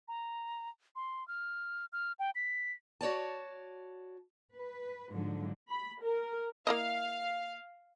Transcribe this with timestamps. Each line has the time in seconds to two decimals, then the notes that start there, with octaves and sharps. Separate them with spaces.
0.08 A#5
0.96 C6
1.28 F6
1.93 F6
2.19 G5
2.35 B6
3.01 F#4 C#5 D5 A5
4.53 B4
5.13 G#2 D3 F3 F#3
5.70 B5
6.02 A#4
6.67 A#3 E4 D#5 F5